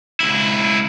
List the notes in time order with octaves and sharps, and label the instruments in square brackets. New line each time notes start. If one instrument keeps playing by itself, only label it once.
[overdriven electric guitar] C#2 E4